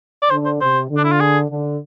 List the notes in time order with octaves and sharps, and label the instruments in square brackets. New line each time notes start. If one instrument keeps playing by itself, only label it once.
[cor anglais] D5
[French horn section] D3 [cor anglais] C5
[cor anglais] C5
[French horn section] C3 [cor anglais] C5
[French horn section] D3
[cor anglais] D4
E4
F4
G#4
[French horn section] D3